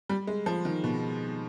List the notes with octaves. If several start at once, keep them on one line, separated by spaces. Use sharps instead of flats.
G3
G#3
F3
D#3
B2